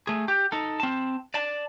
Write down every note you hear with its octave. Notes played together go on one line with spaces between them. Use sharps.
A3 G#4
G4
D#4 A4
C4 A5
D5 A5